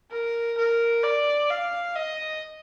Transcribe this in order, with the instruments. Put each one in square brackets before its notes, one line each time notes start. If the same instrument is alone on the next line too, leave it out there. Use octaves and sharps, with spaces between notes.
[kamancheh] A#4
A#4
D5
F5
D#5